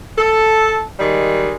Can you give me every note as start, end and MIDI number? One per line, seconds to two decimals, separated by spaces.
0.17 0.81 69
0.99 1.55 51
0.99 1.55 55
0.99 1.55 56